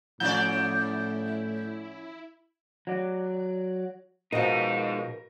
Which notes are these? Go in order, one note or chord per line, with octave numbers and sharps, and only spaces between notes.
A2 F3 C#4 E4 D5 G6
F#3 D5
B2 F3 G#3 D#4 A#4